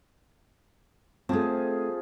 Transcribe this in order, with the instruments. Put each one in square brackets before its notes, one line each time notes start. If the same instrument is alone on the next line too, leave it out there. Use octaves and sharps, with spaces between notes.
[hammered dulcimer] F3 G#4 [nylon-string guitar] A3 C4